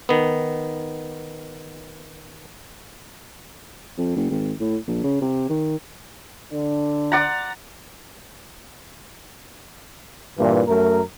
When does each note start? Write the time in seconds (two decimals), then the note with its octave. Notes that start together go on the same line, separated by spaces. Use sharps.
0.09 D#3 B3
3.98 F2
4.16 F#1
4.30 G#1
4.60 A2
4.88 A#1
5.03 C#3
5.21 C3
5.49 D#3
6.53 D3 D4
7.12 D5 F#5 A#5
10.38 G2 A#2 E3
10.68 F#2 A3 A#4